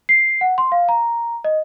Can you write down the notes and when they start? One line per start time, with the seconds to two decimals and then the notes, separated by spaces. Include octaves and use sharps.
0.09 C7
0.41 F#5
0.58 C6
0.72 F5
0.89 A#5
1.44 D#5